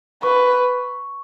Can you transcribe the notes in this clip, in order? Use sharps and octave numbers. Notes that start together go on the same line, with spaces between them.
B4 C#6